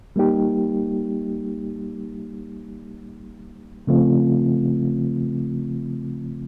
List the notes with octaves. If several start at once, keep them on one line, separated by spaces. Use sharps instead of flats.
G3 A#3 D#4 G4
C#3 F3 A3 C4 F4